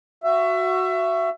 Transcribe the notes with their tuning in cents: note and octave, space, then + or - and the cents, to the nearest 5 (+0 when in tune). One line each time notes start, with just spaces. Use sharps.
F#4 +0 E5 +25